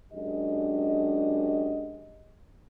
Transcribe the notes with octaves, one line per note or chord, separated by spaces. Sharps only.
F#2 G#3 D4 G4 D#5